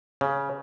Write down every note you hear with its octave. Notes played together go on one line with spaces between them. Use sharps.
C#3